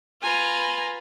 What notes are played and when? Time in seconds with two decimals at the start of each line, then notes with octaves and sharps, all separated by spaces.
0.22 F4 B4 G#5 A#5